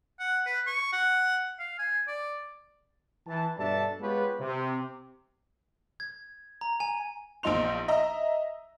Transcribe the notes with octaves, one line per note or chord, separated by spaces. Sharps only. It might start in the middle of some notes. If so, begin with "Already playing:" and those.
F#5
B4
C#6
F#5
F5
G#5
D5
E3 A5
G2 B2 D4 A4 E5 A5
G#3 B3 F4 G4 B4 C#5
C3
G#6
A#5
G#5
A#1 E2 F3 D#4 C6 F7
D#5 E5 A#5